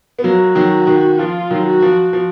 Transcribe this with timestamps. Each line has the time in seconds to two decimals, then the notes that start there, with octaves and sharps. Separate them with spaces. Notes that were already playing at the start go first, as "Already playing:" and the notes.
0.19 B3
0.24 F#3 A#3 F#4
0.55 D#3 F#3
0.87 D#3
1.18 F3 F4
1.51 D#3 F#3
1.66 F#4
1.82 F3
2.13 F3